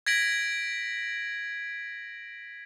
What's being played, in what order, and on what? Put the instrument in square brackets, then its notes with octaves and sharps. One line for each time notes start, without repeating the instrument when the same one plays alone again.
[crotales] G#6 A#6 B6 D7 F#7